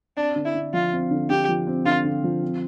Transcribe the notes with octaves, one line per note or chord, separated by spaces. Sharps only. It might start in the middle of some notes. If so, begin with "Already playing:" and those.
C4 D4
D3
E4
D3
F3 F4
C4
D3
D3 G4
F3
C4
D3 F4
D3
F3
C4